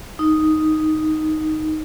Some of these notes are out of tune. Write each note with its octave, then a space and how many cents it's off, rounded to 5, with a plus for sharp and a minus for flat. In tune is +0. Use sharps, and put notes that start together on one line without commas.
D#4 +0